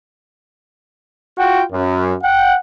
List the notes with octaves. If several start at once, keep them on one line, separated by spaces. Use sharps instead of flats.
F4 F#4 F#5 G5
F#2
F#5 G5